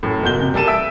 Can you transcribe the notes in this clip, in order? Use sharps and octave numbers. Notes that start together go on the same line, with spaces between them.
F#2 A2
F#1 B2 F#4 G6 G7
C3
G3 A#3 A4 A5 D#7 E7
E5 E6 D7